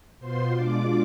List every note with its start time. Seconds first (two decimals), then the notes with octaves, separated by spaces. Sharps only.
0.19 B2 B3 F4 C5 C6
0.54 B2 G#3 D4 F4 D5 D6